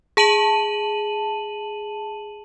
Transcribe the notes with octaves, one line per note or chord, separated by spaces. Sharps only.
G#4 A5 D#7 F#7